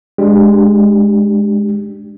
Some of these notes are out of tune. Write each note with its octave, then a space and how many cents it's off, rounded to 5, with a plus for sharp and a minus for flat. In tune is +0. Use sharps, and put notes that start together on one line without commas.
G#3 +0 D4 +5 G4 +0